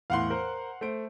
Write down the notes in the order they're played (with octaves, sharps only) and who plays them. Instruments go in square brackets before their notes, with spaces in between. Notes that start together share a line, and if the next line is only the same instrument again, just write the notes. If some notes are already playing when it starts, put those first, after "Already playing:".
[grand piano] E2 A2 [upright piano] F5 F#5 C6
[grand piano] A#4 C5
A3 C5 D7